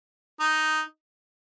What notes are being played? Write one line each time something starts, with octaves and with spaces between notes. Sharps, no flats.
D#4